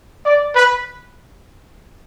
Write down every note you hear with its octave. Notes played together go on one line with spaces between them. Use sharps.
D5
B4